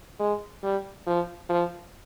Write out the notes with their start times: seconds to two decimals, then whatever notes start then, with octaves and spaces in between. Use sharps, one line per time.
0.20 G#3
0.63 G3
1.07 F3
1.49 F3